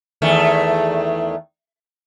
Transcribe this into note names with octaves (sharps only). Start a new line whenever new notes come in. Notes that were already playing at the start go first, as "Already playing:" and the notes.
E2 D#3 A3